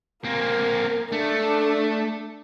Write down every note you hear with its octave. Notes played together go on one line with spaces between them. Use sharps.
A#3 C4 A#4 G#5
A3 D4 A4